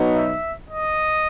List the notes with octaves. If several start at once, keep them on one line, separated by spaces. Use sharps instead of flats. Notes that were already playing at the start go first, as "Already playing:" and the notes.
Already playing: B2 F#3 B3 D#4
E5
D#5